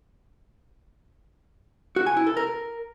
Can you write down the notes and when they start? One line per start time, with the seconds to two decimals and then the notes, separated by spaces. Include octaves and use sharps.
1.96 F#4
2.06 G#5
2.17 E4
2.27 A4
2.37 A#4